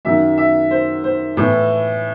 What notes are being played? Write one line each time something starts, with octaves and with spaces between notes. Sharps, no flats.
F#2 D#3 E5
E5
C5
C5
A2 E3